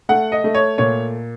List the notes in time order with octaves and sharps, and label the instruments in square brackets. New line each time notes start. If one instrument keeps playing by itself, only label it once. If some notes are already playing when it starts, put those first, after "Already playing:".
[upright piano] A3 F#5
D#5
A3
C#5
A#2 C#5